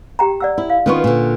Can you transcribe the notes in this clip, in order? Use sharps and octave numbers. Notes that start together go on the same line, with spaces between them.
G4 G5 A#5
D5 F#5 E6
E4
F5
D#3 B3 C#4 F4 B4 C#6
A#2 D3